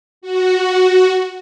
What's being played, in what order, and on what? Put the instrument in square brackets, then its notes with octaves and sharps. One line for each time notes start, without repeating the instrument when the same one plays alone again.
[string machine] F#4